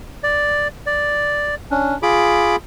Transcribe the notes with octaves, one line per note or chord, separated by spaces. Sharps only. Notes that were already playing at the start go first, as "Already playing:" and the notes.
D5
D5
C#4 D4
F4 G#4 B5 D6